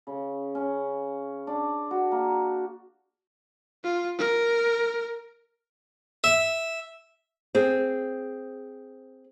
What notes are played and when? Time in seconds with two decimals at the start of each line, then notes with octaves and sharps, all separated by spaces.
0.07 C#3
0.55 C#4
1.47 D4
1.91 F#4
2.12 A#3
3.84 F4
4.18 A#4
6.24 E5
7.55 C4 G#4